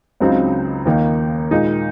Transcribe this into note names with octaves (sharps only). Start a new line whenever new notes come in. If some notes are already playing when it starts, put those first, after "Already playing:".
C#2 C#3 F#3 C4 D#4
D#2 D#3 A#3 D#4
A#2 G#3 D#4